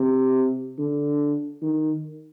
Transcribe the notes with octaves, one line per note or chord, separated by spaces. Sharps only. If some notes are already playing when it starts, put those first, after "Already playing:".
Already playing: C3
D3
D#3